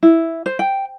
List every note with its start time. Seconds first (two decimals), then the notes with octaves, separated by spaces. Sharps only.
0.03 E4
0.46 C5
0.59 G5